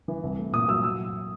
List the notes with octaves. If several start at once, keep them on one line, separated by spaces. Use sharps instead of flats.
E3
C2
A3
A#2 D#6
F#3 E6
E6